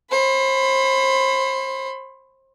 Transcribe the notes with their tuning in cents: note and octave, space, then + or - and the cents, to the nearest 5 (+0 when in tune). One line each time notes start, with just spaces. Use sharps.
C5 +35 B5 +30